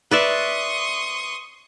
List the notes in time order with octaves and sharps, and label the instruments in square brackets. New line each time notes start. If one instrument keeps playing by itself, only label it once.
[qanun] B4 D5 E5 [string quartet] C6 C#6 D#6